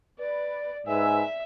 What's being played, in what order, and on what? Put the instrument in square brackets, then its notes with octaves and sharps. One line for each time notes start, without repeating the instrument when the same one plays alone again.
[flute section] B4 [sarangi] D5
[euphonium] G#2 [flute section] B4 G#5 E6 [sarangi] E5